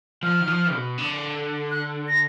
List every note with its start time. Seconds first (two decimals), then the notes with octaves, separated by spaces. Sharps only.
0.23 F3 F6
0.40 D#3
0.48 F3
0.72 B2
0.98 D3
1.71 F#6
2.08 A#6